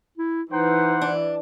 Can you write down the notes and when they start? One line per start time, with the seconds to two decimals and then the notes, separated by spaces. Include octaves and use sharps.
0.18 E4
0.51 E3 D#4 C5 F#5
1.01 D4